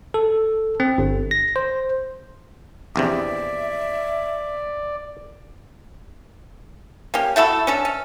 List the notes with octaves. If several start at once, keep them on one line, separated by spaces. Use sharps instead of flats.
A4
C4
G1
A#6
C5
A#1 E2 C3 D5 E5
A#3 C#4 G4
A3 E4 F#4 A4
C#4 D4 A4
C#4